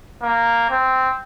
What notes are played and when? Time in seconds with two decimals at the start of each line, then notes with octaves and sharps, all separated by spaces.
0.22 A#3
0.70 C4